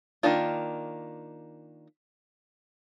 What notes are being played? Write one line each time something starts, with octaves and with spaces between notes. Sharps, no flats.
D#3 A#3 D4 F4